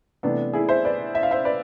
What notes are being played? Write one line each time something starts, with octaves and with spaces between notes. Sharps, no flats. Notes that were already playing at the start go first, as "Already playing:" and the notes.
C3 E3 A3 B3 D4
E4 G#4
C5 E5
B4 D5
E5
F5
C5 E5
B4 D5